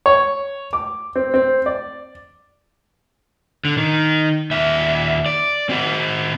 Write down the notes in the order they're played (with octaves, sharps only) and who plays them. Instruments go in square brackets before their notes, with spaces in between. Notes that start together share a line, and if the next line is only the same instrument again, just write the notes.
[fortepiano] C#5
D6
C4
C4
D5
[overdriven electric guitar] D3
D#3
D#2 E5
D5
C4 F#4